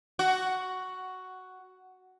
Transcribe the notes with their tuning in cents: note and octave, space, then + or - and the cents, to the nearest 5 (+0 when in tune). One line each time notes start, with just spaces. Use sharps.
F#4 +5